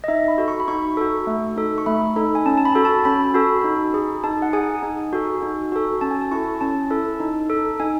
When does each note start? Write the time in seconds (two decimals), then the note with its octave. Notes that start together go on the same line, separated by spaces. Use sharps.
0.04 D#5
0.08 D#4 E5
0.28 B5
0.38 F#4 A4
0.48 C#6
0.60 B5
0.68 D#4 C#6
0.97 F#4 A4
1.27 A3
1.56 D#4 A4
1.78 C#6
1.86 A3 B5
2.16 D#4 A4
2.35 G#5
2.46 C#4 A5
2.57 A5
2.65 B5
2.75 F#4 A4
2.85 A5
3.05 C#4 B5
3.34 F#4 A4
3.64 D#4
3.94 G#4
4.24 D#4 A5
4.42 F#5
4.53 G#4 G#5
4.83 D#4
5.13 F#4 A4
5.42 D#4
5.72 F#4 A4
6.01 C#4 A5
6.11 G#5
6.21 A5
6.31 E4 A4 C#6
6.61 C#4 A5
6.91 E4 A4
7.20 D#4
7.50 A4
7.80 D#4 G#5